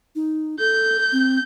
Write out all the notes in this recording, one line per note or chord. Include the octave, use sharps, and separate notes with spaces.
D#4
A4 G6
C4